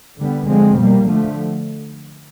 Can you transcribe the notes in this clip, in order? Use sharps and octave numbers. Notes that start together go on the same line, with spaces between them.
D3 G3 B3
D3 F3 G#3 C4
B2 G3 A#3
D3 F3 A3